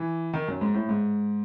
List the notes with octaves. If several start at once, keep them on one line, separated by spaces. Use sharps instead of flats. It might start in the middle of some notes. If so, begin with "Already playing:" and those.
Already playing: E3
D#3
F#2
G#2
A2
G#2